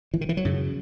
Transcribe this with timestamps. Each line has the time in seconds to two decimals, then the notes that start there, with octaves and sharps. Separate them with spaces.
0.14 E3
0.21 D#3
0.29 E3
0.37 F#3
0.45 F#2 C#3